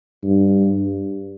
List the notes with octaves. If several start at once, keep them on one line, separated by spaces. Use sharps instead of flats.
G2